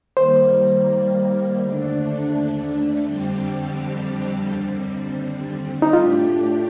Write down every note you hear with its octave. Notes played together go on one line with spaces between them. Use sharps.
D#3 G3 A#3 C5
D#2 D3 A3 D4
F2 D3 G3 C4 G4
D#2 D3 G3 C4
D#4
A2 A3 D4 F4 G4